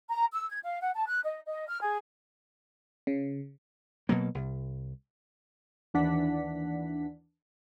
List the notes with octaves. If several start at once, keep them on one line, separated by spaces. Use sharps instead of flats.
A#5
E6
G#6
F5
F#5
A5
F#6
D#5
D#5
F6
G#4
C#3
B2 F#3 A#3
C2
D#2 E3 D4 F#5 B6